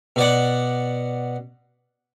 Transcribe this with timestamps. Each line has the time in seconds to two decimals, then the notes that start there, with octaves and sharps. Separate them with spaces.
0.16 B2 D5 F#5